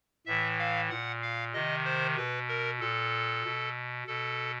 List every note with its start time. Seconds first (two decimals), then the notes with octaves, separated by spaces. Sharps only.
0.26 A2 E3 E5
0.59 F5
0.90 A#2 F#5
1.22 F5
1.53 C3 D#3 D#5
1.85 C5
2.17 B2 B4
2.48 A#4
2.80 A#2 A4
3.44 B2
4.07 B2 A4